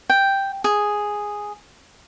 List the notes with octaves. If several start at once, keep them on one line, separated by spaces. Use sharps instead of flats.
G5
G#4